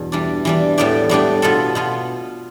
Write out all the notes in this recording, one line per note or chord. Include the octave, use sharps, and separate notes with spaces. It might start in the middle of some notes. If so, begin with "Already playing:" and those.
Already playing: E2 G2 B2
E3 G3 D4
E3 G3 D4
A2 G3 B3 D4 G4
A2 G3 B3 D4 G4
B2 B3 F4 A4
B2 B3 F4